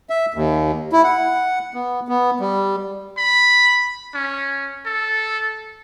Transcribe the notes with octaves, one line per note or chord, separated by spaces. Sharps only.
E5
D#2
E4
F#5
B3
B3
G3
B5
C#4
A4